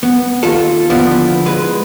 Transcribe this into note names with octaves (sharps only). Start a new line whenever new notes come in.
B3
D#2 F4 A4
D3 F3 B3 D4 E4
G#3 B4